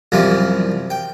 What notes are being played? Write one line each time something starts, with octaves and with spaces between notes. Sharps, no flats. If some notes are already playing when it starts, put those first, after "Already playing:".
C2 F#2 E3 F3
G5